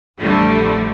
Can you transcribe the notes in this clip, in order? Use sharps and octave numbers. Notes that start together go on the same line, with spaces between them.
A1 F2 D3 G3 A3